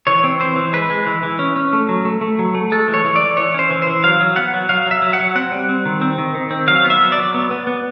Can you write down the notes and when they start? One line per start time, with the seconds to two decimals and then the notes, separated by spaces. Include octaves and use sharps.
0.07 E3 C#5
0.24 C4
0.40 E3 C5
0.56 E3
0.73 G#3 B4
0.90 G#3
1.07 E3
1.23 E3
1.39 C#4
1.56 C#4
1.73 A3
1.89 F#3
2.05 A3
2.21 A3
2.39 F#3
2.55 A3
2.72 G#3 A4
2.88 E3
2.94 C#5
3.05 E3
3.16 E3 D5
3.37 E3 C#5
3.54 C#4 C5
3.71 E3
3.82 E3 C5
4.04 F#3 F5
4.20 F#3
4.36 B3 F#5
4.54 F#3
4.69 F#3 F5
4.86 F#3 E5
5.02 F#3
5.13 F#5
5.20 F#3
5.35 C4 F#5
5.52 G3
5.69 C4
5.85 D#3
6.02 C4
6.18 D#3
6.34 D#3
6.51 C4
6.67 F#3 F5
6.84 B3
6.90 E5
7.01 F#3
7.12 D5
7.18 F#3
7.34 B3
7.51 B3
7.67 B3